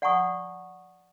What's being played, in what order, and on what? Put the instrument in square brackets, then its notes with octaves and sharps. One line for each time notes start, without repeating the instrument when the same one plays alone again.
[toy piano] D5 F#5 G#5 A#5 C#6 D#6